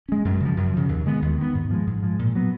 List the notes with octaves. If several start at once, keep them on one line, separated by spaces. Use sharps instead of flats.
G#3 C#4
F#2
C#3 F3
F#2
C#3 F3
D#2
D#3 G#3 B3
D#2
D#3 G#3 B3
G#2
F3 G#3
G#2
F3 G#3
A#2
F#3 B3